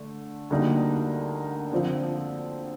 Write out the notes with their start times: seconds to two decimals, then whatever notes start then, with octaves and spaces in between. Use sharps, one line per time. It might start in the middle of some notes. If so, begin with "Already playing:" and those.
Already playing: D3 A3
0.50 D2 D3 G3 A#3 D#4
1.72 D3 F3 C4 F4